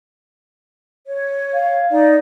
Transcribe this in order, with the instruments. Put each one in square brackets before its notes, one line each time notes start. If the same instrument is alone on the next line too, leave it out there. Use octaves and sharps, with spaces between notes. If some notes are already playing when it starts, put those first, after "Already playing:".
[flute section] C#5
[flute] F5
[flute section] D#4 D5